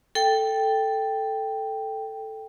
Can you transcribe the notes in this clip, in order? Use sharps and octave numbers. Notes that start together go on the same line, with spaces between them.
A4 G5